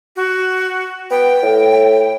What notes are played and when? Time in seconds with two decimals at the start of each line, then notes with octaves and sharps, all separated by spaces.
0.16 F#4
1.11 B3 G5
1.43 A2